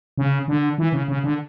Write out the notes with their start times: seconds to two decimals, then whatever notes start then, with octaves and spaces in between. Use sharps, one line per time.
0.18 C#3
0.48 D3
0.78 E3
0.92 C#3
1.08 C#3
1.24 D3